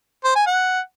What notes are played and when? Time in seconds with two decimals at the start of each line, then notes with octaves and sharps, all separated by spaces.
0.24 C5
0.35 G#5
0.47 F#5